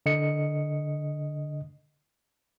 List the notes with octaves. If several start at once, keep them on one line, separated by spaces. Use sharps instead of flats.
D3 D#5 C#7